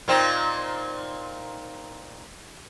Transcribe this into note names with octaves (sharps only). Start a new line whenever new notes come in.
A#2 C4 D#4